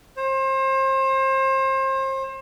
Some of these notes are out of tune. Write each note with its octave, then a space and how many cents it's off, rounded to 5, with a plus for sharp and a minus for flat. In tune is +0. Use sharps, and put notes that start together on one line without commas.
C5 +35